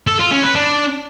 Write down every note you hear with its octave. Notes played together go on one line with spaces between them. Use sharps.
A4
F4
C#4
B4
D4